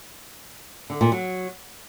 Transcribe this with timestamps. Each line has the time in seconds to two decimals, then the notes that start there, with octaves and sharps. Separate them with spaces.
0.90 D3
1.01 A#2
1.12 F#3